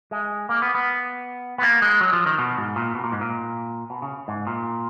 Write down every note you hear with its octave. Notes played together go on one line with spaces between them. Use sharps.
G#3
A#3
B3
B3
B3
A#3
G#3
F#3
F3
D#3
B2
G#2
A#2
B2
A#2
G#2
A#2
B2
C#3
G#2
A#2